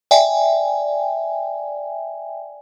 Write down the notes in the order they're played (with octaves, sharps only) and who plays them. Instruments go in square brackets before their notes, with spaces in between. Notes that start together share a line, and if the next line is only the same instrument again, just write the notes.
[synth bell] D5 E5 G5 G#5